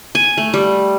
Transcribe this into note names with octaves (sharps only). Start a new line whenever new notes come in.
G#5
A3
G3